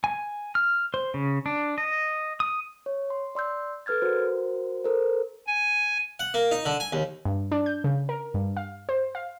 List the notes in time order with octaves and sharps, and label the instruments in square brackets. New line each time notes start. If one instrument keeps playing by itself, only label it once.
[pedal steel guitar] G#5
F6
C5
C#3
D4
D#5
D#6
[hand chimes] C#5
C6
D5 C6 E6 G6
A4 B4 F6 G#6 A6
F#4 A#4 C5
A4 A#4 C5
[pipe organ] G#5
[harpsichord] F#5
A#3
D#4
D3
G#5
D#2
[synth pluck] G2
D4
G6
C#3
A#4
G2
F5
C5
F5